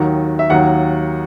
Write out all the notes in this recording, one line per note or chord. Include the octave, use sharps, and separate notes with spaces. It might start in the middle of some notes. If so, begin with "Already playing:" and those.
Already playing: D#2 D#3 F#3 F#5
E5
D#2 D#3 F#3 F#5